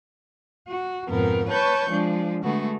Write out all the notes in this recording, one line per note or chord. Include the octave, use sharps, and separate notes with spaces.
F#4
F2 G#2 B2 B3 A#4
B4 C#5 A5 C#6 G6
F3 G#3 D4
D3 G#3 A3 B3 F#4